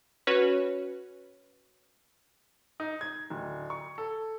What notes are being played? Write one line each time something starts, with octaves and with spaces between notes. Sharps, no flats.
C#4 F#4 B4 C#5
D#4
G#6
D1
C#6
A4